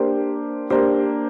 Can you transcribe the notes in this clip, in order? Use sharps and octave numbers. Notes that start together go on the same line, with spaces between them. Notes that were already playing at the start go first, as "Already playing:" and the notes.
Already playing: A#3 D4 G4 C5
A#3 D4 G4 C5